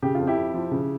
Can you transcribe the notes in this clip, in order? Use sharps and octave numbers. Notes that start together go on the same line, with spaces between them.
C#3 G4
F2 F4
E4 G4
F2
F3
C#3